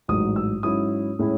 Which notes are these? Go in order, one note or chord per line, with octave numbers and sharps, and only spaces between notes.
A1 G#2 F#3 D#6
E6
G#2 F#3 C#4 E4 D#6
A2 G#3 C#4 E4